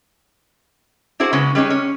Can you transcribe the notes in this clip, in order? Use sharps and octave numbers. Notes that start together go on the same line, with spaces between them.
D4 E4 F#4 G#4 C5
C#3 G#3 B3 C#4
G3 G#3 C#4 D#4
C#4